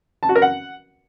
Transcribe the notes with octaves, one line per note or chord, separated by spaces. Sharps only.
A5
F#4
A#4
F#5